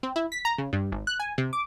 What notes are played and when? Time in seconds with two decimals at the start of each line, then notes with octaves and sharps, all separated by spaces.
0.03 C4
0.16 E4
0.32 B6
0.45 A#5
0.58 C#3
0.73 G2
0.92 G#1
1.07 F#6
1.20 G#5
1.38 C3
1.53 D6